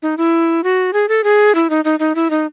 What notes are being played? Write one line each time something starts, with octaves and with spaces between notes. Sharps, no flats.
D#4
E4
F#4
G#4
A4
G#4
E4
D#4
D#4
D#4
E4
D#4